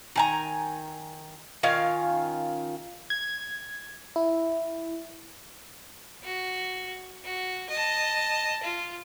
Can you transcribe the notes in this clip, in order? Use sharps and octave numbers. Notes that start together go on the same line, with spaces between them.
D#3 G#5 A#5
D#3 C#4 F4 F5
G#6
E4
F#4
F#4
D#5 A5
F4